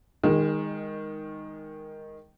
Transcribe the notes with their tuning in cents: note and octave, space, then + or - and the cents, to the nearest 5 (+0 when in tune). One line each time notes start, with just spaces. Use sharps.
D#3 +0 G#3 -25